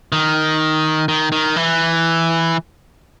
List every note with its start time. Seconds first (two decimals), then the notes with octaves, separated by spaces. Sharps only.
0.12 D#3
1.08 D#3
1.32 D#3
1.56 E3